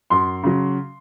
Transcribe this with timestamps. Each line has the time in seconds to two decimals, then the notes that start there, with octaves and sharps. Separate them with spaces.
0.10 F#2 C6
0.43 C#3 F#3